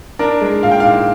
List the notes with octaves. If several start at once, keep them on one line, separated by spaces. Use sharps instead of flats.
D4 A#4
G#3
A#2 F5
G5
A#2 F5